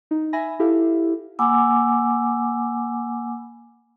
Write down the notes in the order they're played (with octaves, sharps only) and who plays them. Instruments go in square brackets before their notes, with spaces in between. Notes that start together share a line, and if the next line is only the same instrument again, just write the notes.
[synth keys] D#4
E5 G#5 B5 A#6
E4 G4 A4 E5 F5
[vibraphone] A#3 F#5 G#5 B5 D6 E6